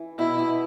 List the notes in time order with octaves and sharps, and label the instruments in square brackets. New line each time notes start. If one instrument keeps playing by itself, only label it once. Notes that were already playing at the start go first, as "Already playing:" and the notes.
Already playing: [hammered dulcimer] E3
[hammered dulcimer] B2 [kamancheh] E4
[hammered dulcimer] B2